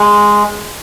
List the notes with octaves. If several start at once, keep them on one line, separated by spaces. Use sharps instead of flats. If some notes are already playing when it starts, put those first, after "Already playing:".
Already playing: G#3